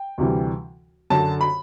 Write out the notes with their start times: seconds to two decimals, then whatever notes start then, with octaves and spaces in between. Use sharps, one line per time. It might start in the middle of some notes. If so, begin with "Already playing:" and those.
Already playing: G5
0.18 D2 C3 E3 G3
1.10 F#2 D3 F#3 A5
1.41 B5